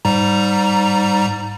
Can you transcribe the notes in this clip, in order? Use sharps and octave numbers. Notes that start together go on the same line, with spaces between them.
G#2 G3 A#5